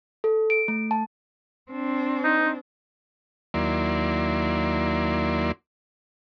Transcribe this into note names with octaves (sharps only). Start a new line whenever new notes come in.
A4
D7
A3
A5
C4 D4
D#4
D#2 F#3 A#3 E4 D5 C6